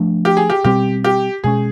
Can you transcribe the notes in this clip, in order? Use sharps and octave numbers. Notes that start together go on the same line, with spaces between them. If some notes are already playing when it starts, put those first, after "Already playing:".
Already playing: F3 A3 D4
G4
G#4
G4
B2 G3 C4 G4
G4
B2 G#3 C#4 G#4